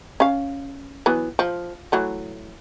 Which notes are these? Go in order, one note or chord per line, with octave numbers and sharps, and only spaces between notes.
C#4 F5
E3 F#3 B3
F3
E3 F#3 A3